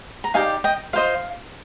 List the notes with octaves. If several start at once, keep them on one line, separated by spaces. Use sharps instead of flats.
A#5
D#4 G4 D5 F5 G#5
D#5 G5
F4 C5 D#5 F5